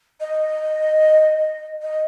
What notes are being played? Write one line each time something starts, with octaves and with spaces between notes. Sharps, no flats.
D#5
D#5